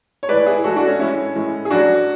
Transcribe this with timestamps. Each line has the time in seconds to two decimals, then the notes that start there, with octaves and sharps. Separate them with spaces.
0.23 C#5
0.29 A2 E3 G#3 B4 D5
0.46 E4 G#4
0.64 A2 E3 G#3 F#4 A4
0.76 D4 F#4
0.87 C#4
0.99 A2 E3 G#3 C#4 E4
1.35 A2 E3 G#3
1.65 G#4
1.70 A2 F#3 D4 F#4